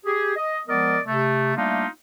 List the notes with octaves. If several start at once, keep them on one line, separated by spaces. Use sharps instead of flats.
G4 G#4
D#5
F3 G#3 B3 A#4 D5 D#5
C3 A3
G3 A3 A#3 D4 D#4 F4